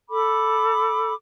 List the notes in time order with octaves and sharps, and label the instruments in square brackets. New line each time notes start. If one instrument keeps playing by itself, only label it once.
[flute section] A4 B5 D6